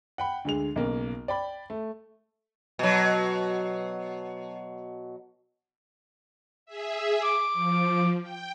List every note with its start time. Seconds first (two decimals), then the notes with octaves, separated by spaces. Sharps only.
0.18 F#5 G5 B5
0.45 D2 D3 G#3 F7
0.76 B1 C#3 A#3
1.28 D5 G5 B5
1.70 A3
2.79 B2 F#3
6.66 G#4 E5
7.22 D6
7.53 F3
8.22 G5